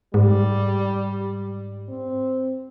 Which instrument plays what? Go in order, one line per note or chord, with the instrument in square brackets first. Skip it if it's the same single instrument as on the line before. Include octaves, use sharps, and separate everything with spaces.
[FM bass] G#2 [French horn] G3
[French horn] C4